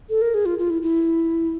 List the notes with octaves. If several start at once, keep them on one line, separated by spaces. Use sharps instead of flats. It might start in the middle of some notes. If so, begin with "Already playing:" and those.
A4
A#4
G#4
F4
F4
E4
E4